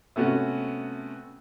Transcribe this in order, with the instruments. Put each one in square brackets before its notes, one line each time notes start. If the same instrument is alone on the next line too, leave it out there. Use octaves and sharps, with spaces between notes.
[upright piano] C3 A3 B3 C#4 F#4